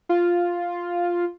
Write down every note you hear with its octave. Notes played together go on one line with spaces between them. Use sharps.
F4